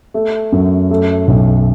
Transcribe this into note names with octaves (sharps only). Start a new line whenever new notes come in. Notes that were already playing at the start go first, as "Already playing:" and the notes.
A3
F#2
A3
B1